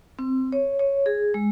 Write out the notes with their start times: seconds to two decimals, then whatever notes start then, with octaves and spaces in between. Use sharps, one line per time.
0.19 C4
0.52 C#5
0.79 C#5
1.06 G#4
1.34 G#3